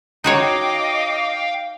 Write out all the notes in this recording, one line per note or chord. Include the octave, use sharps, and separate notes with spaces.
D#4 F#4 C#5 D#5 F5 G5 D6